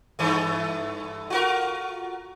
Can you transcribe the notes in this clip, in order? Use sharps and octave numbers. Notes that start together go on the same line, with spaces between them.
G2 E3 A3
F4 F#4 A#4